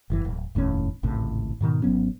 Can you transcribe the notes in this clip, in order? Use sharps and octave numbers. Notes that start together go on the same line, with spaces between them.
F#1 D#3 E3
D1
F1 D#2 A2 C#4
G#1 C#2 A2 C3
G#2 B2 D#3
G#1 F#3 B3 C#4